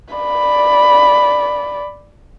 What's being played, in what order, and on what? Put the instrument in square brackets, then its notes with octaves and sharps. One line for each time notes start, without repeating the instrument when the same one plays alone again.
[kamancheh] D5 B5